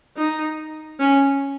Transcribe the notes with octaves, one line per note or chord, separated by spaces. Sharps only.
D#4
C#4